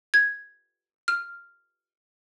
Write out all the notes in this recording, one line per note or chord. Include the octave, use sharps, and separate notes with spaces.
G#6
F6